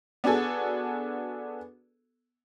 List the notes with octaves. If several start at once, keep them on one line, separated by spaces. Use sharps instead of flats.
B3 D4 F#4 G#4 A4